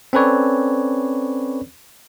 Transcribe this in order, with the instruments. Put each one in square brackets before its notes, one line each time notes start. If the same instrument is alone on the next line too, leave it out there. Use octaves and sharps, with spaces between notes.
[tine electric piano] C4 C#4 A4 B4 C#5 D5